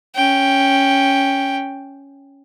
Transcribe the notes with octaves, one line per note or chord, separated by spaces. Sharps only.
C#4 G5